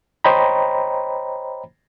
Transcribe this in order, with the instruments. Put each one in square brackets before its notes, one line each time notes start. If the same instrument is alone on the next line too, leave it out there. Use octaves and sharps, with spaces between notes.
[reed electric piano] C5 C#5 D#5 G5 A#5 B5